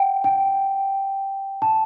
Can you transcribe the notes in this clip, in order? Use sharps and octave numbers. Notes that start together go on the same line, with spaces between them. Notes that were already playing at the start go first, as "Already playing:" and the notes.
Already playing: F#5 G5
G5
A5